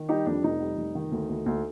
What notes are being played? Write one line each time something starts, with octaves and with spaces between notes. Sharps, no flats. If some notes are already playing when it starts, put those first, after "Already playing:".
Already playing: D#3
G3 D#4 G4
F2 D4
F1 D#4
G3
F1
D#3
D2
D2
D2